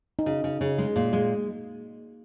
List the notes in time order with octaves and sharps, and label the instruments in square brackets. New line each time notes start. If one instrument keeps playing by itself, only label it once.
[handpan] D#4
[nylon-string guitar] C#3 [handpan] F#4
[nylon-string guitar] C#3
C#3
G#3
A#2
G#3